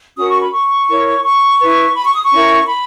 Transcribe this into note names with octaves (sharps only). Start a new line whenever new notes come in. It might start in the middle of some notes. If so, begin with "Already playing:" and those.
C#4 F#4 A#4 D#6
C#6
B5
C#6
E4 A#4 C#5
C#6
E4 B4
B5
C#6
D#6
C#6
C#4 E4 A#4
B5